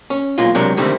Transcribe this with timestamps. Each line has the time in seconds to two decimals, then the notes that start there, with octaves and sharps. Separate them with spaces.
0.10 C#4
0.38 B1 A#2 G#3 F4
0.55 C3 F#3 G#3 D4 A#4
0.77 D3 D#3 G3 A3 C4